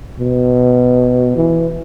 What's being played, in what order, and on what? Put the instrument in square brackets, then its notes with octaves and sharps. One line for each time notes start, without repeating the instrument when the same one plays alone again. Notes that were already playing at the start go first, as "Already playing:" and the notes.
[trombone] B2
E3